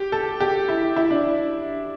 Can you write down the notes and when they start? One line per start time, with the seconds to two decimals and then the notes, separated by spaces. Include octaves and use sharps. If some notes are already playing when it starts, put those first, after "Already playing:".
Already playing: G4
0.12 A4
0.40 G4
0.69 E4
0.96 E4
1.11 D4